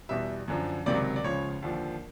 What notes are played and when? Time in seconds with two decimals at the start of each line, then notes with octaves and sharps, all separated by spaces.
0.09 E2 B2 G3 E5
0.48 F#2 D3 F3
0.86 C#2 C3 D#3 F#3 D5
1.16 D5
1.24 C#2 C#3 F3 C#5
1.62 D#2 D3 F3